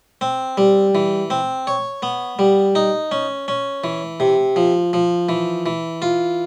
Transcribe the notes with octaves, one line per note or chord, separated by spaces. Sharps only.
C4
G3
E3
C4
C#5
B3
G3
D#4
C#4
C#4
E3
C3
F3
F3
E3
E3
F4